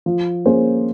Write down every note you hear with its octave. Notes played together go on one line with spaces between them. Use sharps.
F3
A#3 C#4 G#4 C5